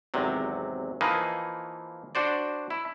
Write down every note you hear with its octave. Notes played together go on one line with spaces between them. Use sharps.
G#1 E2 C3 F#3
E3 F3 A#3 D#4 G#4 B4
D4 F#4 C5 D5
E4